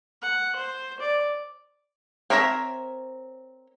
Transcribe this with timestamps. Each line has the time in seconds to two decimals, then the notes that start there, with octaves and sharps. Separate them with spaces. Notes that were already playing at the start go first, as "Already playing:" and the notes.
0.22 F#5
0.56 C5
1.00 D5
2.30 C4 A#4 C#5 E5 A#5